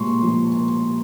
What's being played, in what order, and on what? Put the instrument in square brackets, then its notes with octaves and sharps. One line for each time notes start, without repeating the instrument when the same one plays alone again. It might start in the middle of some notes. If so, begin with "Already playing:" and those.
Already playing: [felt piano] A#2 G#3 C6 C#6
F3